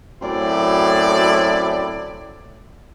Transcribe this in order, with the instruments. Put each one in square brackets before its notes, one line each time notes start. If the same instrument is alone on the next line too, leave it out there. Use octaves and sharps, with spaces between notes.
[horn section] F#2 A2 F#3 C4 E4 D5